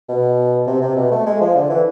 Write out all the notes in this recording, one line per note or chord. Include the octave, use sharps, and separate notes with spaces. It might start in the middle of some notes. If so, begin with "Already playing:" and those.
B2
C3
C3
B2
A3
G#3
F3
D3
E3